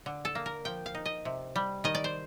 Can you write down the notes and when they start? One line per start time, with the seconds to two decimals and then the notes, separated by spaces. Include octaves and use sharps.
0.06 D3
0.25 A4
0.35 A#3
0.46 A#4
0.65 F3 G5
0.86 F5
0.95 D#4
1.06 D#5
1.25 C3
1.56 G3
1.84 D#3 D#5
1.95 D5
2.04 C5